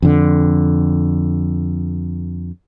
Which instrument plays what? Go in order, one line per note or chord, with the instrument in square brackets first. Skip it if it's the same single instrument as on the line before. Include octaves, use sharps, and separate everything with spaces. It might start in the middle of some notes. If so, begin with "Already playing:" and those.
[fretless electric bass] F2 D3